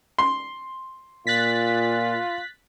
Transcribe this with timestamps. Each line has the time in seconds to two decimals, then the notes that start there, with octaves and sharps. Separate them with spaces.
0.19 C6
1.27 A#2 F4 F#6 A6 B6